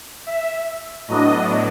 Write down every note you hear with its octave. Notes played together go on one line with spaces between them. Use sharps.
E5
A2 F#3 B3 D4 D#5